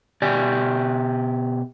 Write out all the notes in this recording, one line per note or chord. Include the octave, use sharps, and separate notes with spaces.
B2 G4 D5 G#5